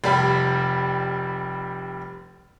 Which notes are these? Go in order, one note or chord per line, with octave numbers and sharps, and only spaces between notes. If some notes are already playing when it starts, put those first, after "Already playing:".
F1 G3 B5